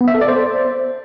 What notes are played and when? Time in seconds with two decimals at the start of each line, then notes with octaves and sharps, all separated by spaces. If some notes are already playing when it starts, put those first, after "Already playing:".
0.01 B3
0.08 E5
0.15 A4
0.21 D5
0.28 C5